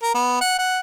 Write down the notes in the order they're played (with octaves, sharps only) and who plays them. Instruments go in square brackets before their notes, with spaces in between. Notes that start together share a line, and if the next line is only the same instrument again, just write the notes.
[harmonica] A#4
B3
F#5
F#5